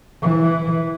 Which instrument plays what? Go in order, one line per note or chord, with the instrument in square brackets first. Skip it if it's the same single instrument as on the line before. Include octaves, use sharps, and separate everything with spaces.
[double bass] E3